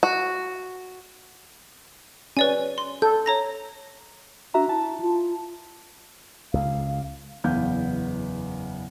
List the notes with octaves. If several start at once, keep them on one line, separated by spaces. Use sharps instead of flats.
F#4
C#4 B4 D5 G#5
C6
A4 G6
C#5 A#5 A#6
D4 F#4 E5 A#5
E4 A5
F4
C#2 F5
F#1 E2 B3 B4 F5 G6